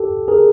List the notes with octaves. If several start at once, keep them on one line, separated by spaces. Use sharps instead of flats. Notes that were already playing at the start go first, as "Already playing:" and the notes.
Already playing: G4 A4
G#4 A#4